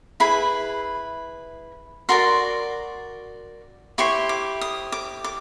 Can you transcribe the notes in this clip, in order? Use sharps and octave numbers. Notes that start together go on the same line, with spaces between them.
E4 G#4 B4 B5
F#4 A#4 D5 C6
E4 G4 C5 C#6
D6
D#6
D6
D6